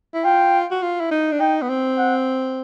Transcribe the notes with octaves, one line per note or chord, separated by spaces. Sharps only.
E4
F4 G5
F#4
F4
E4
D#4
D4
D#4 G5
B3
C4
F#5